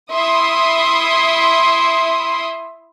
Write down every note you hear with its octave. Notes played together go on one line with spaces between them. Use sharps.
E4 E5 C6 D#6